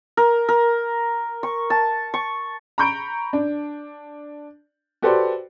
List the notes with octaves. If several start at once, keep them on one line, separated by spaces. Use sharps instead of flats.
A#4
A#4
C#6
A5
C#6
A#5 B5 C#6 G6 D7
D4
F#4 G4 A4 B4 C5 D5